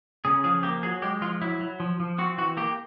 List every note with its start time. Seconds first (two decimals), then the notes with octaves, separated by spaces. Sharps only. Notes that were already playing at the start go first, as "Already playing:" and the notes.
0.25 C#3 G#4
0.44 F3 G#4
0.63 A#3 G4
0.83 F#3 G#4
1.02 G#3 G4
1.21 F3 F4
1.42 F#3 E4
1.61 F#3
1.80 F3
2.00 F3
2.18 C4 F#4
2.38 E3 F#4
2.57 A#3 G4